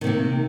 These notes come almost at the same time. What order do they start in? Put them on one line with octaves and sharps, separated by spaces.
D#3 C3 A#3